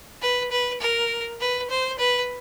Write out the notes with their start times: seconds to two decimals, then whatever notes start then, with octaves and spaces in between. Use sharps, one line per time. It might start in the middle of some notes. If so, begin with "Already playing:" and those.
0.22 B4
0.51 B4
0.81 A#4
1.40 B4
1.70 C5
1.99 B4